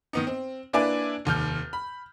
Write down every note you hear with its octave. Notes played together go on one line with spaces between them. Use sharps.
D#3 B3 D#4
C4
A#3 D4 E4 B4 D5 G#5
F1 D#2 F6 G6
B5